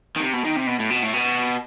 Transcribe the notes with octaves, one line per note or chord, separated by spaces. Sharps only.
D#3
C3
B2
D#3
C3
B2
A2
B2
A2
B2